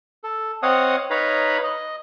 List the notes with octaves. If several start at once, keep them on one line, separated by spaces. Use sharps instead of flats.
A4
C4 C#5 D#5 F5 F#5 D#6
D#4 B4 C#5 F5 A#5 B5
D#5